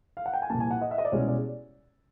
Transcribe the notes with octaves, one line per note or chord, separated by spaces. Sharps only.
F5
F#5
G5
G#5
C2 A#2 F3 A#3 A5
G#5
F#5
D#5
E5
D#5
D5
C2 B2 G#3 C#4 C#5
D5